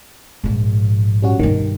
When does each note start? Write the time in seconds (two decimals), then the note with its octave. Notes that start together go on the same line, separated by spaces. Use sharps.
0.44 A#1 G#2
1.22 G3 C#4 F#4
1.39 G2 B2 D#3